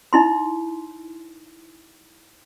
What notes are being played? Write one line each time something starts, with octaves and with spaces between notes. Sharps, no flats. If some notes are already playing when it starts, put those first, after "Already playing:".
D#4 E4 C6